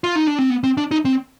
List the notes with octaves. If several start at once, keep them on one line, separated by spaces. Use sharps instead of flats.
F4
D#4
D4
C4
B3
C4
D4
D#4
C4